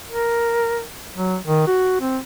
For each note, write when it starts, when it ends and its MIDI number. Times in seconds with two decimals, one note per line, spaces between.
0.09 0.83 70
1.14 1.36 54
1.46 1.64 51
1.67 1.98 66
2.01 2.18 60